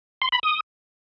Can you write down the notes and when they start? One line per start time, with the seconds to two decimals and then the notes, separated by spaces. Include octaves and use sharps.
0.22 C6
0.32 B5
0.43 D#6